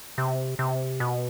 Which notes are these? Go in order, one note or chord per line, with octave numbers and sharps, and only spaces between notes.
C3
C3
B2